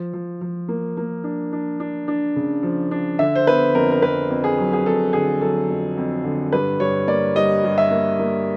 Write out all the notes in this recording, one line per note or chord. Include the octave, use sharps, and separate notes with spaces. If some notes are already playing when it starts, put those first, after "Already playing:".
Already playing: F3
F3
F3
A#3
A#3
D4
D4
D4
D4
C#3
F3
D4
D3 E5
C5
B3 B4
F2 A#4
A#4
F2 B4
F2
G#4
F#3
G#4
F2 A4
D3 G#4
F#3 A4
F2
F2
D3
G2 B4
G2 C#5
A#3 D5
G3 D#5
G2
E5
A#3
A#3